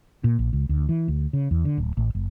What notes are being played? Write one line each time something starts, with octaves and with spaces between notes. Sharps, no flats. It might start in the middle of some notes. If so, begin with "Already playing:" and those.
A#2
A#1
C#2
D2
E3
D2
C#3
E2
D3
D1
A1
F#1